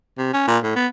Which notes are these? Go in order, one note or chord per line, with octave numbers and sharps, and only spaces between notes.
C3
C#4
A#2
A2
B3